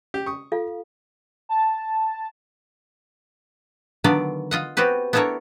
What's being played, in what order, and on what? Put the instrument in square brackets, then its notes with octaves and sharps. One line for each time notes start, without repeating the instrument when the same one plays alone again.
[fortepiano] G4
C#6 D#6
[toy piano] F4 A4 F5
[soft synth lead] A5
[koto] D3 D#3 F#3 B3 F4 D5
F4 D#5 F#5
B3 C4 F#4 G4 B4
B3 D4 E4 A4 A#4 C#5